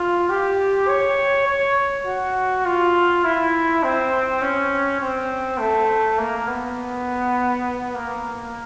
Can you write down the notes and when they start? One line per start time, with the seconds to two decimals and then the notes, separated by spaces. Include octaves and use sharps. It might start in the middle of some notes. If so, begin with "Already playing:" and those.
Already playing: F4
0.30 G4
0.88 C#5
1.47 C#5
2.06 F#4
2.65 F4
3.24 E4
3.83 C4
4.41 C#4
5.01 C4
5.59 A3
6.19 A#3
6.48 B3
7.95 A#3